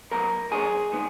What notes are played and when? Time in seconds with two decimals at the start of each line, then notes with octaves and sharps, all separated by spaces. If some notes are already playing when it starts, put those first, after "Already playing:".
0.11 B2 F#3 B3 A#4 A#5
0.51 B2 F#3 B3 G#4 G#5
0.92 D#3 G#3 B3